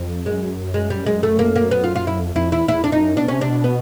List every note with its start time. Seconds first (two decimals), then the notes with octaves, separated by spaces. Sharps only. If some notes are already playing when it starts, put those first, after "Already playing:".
Already playing: F2
0.26 F#2 G#3
0.74 G#3
0.90 G3
1.06 G#3
1.23 A3
1.39 A#3
1.56 A#3
1.71 B3
1.84 F4
1.96 F4
2.07 E4
2.20 F2
2.35 F2 E4
2.51 E2 E4
2.68 E2 E4
2.84 F2 D4
2.92 D#4
3.00 F#2
3.16 B2 D4
3.28 C3 C#4
3.41 D4
3.49 B2
3.64 B3